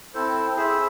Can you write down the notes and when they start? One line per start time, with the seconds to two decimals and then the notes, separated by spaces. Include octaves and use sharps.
0.14 C4 E4 A4 C5
0.56 E4 G#4 C5 E5